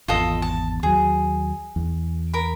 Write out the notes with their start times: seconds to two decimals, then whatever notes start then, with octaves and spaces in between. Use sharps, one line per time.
0.08 G#1 E2 F4 A4 D#5
0.42 A5
0.83 D#2 F#3 G#4
1.76 E2
2.34 A#4 B5